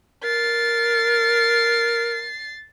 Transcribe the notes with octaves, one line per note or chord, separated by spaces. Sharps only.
A#4 A6 C7